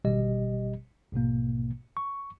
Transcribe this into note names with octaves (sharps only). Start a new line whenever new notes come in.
G#1 B2 G3 G4 D#5
A#1 G#2 B2 A#3
C#6